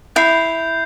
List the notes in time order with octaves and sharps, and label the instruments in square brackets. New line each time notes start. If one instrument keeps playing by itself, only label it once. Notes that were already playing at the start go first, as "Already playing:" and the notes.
[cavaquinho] E4 [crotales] G6 C7 F7